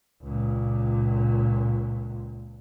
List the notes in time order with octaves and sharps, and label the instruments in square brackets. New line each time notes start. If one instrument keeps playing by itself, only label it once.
[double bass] C#2 A#2